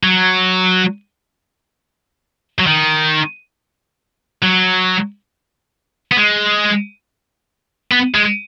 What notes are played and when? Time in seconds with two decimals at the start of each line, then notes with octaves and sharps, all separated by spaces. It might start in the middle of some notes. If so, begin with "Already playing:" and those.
0.03 F#3
2.59 F#3
2.67 D#3
4.42 F#3
6.12 B3
6.17 G#3
7.91 B3
8.14 G#3